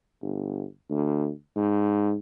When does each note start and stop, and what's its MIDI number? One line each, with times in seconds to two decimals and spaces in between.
0.22 0.64 31
0.90 1.30 38
1.56 2.15 44